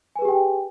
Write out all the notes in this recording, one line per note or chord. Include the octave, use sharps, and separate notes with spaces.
G4 G#4 B4 G5 G#5